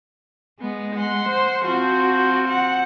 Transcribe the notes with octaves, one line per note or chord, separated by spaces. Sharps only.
G#3 B3
F#5 C6
C5
F3 C4 F#4
F#5